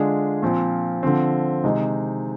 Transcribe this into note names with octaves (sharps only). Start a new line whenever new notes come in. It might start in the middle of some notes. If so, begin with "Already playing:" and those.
Already playing: D3 G#3 D4 F4 G#4
A#2 F3 C4
D3 F3 C4
C3 D#3 G#3 D#4